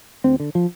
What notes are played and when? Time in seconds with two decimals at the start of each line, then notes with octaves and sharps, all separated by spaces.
0.24 D2 C4
0.40 D3
0.55 F3